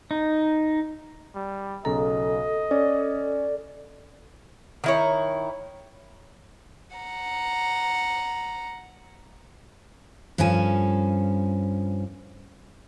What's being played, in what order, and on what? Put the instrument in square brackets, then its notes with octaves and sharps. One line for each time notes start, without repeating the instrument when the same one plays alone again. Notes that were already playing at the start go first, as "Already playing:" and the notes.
[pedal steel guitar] D#4
[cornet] G3
[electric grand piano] B1 C#3 A#5 [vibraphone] A4 [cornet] D#5
[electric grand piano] C#4 [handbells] D5
[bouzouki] D#3 E4 C#5
[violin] F#5 A#5
[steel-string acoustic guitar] G2 F3 C#4 A4 G#5